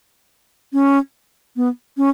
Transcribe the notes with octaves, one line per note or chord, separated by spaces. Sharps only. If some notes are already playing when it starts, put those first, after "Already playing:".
C#4
B3
C#4